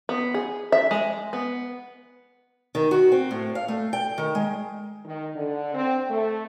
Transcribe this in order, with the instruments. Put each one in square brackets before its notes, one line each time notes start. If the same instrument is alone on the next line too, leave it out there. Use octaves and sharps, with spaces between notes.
[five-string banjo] B3
G#4
E5
G#3
B3
[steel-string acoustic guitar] D#3
F#4
C4
A2
F5
A3
G5
D#3
G#3
[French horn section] D#3
D3
C4
A3